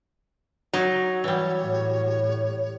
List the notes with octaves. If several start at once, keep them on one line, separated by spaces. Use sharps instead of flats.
F#3 D#4
E3 G3 C#5
A2